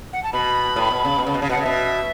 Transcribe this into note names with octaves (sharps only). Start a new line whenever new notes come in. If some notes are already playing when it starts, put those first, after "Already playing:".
F#5
A5
B2 B5
A2
B2
C#3
B2
C#3
B2
C#3
B2 F#5
C#3
B2 E5